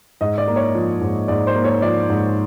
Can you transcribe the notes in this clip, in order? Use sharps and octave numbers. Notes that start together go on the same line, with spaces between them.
G#2 D#5
D5
A#3
C#5
F3
G#2
G#2 D5
C5
A#3
C#5
F3 D5
G#2